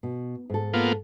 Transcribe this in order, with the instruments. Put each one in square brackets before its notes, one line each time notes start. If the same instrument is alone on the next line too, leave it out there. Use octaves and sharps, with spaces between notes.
[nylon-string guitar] B2
G#2 A4
[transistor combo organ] A#3 B3 F4